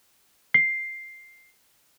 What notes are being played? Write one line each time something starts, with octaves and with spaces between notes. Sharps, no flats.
C7